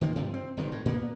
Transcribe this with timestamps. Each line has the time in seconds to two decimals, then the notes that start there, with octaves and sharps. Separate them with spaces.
0.01 D#3 F3 A#3
0.16 G2 C3 F3
0.34 C4
0.57 G1 C3 D#3
0.72 A2
0.85 A#2 A#3 B3